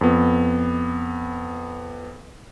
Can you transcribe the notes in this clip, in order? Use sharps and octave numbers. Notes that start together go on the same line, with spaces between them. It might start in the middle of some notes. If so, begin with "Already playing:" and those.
F2 B3